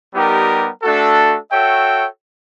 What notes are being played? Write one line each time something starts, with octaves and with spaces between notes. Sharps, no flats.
G3 B3 D#4 G4 A#4
A3 D4 F#4 A4
F#4 A4 C#5 E5 G5